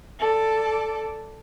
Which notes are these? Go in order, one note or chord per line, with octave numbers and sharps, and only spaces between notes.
A4 D5